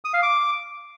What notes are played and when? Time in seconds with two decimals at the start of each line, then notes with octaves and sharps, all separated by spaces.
0.05 D#6
0.14 F5
0.23 D6